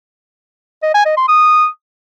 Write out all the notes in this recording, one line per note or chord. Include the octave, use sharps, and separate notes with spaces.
D#5
G#5
D#5
C6
D#6